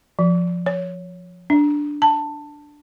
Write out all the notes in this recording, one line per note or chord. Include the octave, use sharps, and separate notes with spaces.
F3
C#5
D4
A5